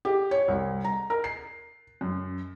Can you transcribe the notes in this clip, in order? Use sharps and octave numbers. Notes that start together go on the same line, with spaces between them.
G4
C#5
C2
A#5
A#4
C7
F#2